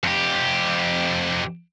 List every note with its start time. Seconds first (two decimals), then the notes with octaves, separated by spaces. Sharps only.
0.03 F2 G4